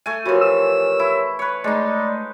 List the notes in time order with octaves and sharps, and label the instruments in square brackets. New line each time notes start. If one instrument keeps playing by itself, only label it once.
[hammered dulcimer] A3 G#5
[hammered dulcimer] E3 F3 [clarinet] F#4 [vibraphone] G4 A#4 C#5
[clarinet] E6
[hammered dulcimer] E4
B4 C#5
[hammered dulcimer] G#3 D#4 [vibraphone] A3 [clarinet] D5